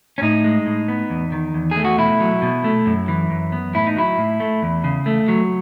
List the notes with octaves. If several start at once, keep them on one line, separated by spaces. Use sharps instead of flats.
C#4
A2 D#4
G#3
A2
B3
E2
D#3
E2
A3 G#4
F#4
B2 E4
F#3
B2
A3
F#2
E3
F#2
B3
A2 E4
D#4
F#3 E4
A2
A3
E2
C#3
A3
F#3